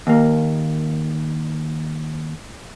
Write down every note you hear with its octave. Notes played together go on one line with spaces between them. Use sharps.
D#2 A#3